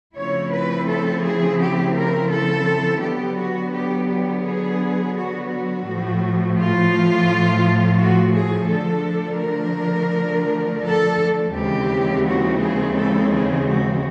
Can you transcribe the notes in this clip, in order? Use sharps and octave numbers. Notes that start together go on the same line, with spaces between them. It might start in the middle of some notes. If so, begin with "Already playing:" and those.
C#3 F3 A3 C4 E4 C#5
B4
A4
G#4
G4
A#4
A4
D3 F#3 B3 G4
F#4
G4
G4
G#4
F#4
F#4
A2 F3 A3
F4
F#4
G#4
D3 F3 A3 D4 A4
A#4
A4
D#2 C#3 E3 G#3 C4 G4
F#4
G#4
A4
G#4
F#4